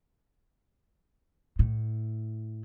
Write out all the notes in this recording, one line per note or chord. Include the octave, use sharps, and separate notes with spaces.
A2